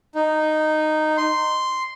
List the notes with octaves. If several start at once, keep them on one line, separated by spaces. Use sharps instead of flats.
D#4
C6